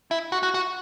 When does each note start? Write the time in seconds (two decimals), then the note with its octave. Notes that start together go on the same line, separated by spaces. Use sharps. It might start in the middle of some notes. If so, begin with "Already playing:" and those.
0.11 E4
0.32 F#4
0.43 F#4
0.54 F#4